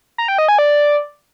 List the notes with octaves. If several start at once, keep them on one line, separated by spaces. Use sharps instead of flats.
A#5
G5
D#5
G#5
D5